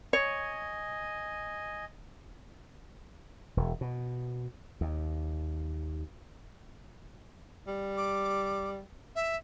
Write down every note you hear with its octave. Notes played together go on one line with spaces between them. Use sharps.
C#5 D#5 G#5
E1
B2
D#2
G3
D6
E5